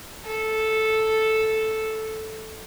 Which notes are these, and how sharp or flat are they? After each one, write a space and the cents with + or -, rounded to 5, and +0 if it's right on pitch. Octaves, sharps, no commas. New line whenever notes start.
A4 -5